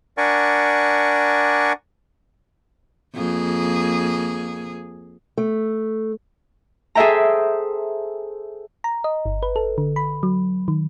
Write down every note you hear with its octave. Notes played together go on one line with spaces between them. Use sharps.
D4 A#4 D5 F#5 G#5 C#6
F2 A#3 G#4
A3
G#4 A4 C5 E5 G5 A#5
A#5
D#5
G1
B4
A4
D3
B5
F#3
D#3